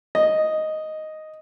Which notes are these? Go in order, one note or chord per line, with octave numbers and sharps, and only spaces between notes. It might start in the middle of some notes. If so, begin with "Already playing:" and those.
D#5